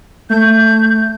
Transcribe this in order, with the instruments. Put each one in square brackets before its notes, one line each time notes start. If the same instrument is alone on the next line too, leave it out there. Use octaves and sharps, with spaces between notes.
[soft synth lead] A3 [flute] G6